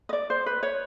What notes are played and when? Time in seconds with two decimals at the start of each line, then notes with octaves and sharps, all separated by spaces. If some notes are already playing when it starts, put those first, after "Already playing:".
0.09 D#5
0.13 D5
0.30 C5
0.46 B4
0.63 C#5